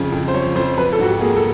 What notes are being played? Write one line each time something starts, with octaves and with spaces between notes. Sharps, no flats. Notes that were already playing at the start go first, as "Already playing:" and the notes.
Already playing: F2 C#3 F3
F2
C5
F3 C#5
F2 C5
F3 B4
A4
G#2 F#4
G4
A#3 G#4
A4